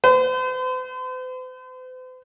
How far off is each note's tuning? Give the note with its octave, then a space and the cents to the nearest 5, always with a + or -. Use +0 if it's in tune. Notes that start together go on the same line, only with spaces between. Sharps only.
C5 -45